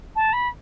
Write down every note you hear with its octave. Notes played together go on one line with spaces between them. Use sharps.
A5
B5